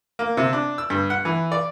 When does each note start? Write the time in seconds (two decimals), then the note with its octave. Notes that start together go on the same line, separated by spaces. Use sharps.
0.19 A#3
0.37 C3
0.53 D4
0.78 E6
0.90 G2
1.10 F#5
1.25 E3
1.52 D5